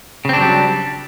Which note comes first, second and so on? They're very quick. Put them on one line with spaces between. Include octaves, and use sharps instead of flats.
C#3 C4 D4 F#3 G3